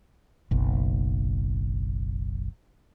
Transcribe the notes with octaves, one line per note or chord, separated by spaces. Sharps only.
F#1 B1